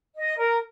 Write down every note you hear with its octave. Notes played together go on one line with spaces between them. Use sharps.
D#5
A#4